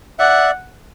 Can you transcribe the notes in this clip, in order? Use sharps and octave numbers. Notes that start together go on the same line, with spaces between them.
D5 E5 F#5